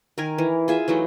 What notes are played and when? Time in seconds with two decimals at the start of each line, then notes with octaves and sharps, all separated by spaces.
0.18 D#3 A#4 G#5
0.38 E3
0.68 F4 G#4 E5
0.88 E3 F#3 A3 D#4